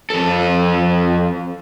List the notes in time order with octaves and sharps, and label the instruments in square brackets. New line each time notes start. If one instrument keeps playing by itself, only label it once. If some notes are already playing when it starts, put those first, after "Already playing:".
[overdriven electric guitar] F2 A4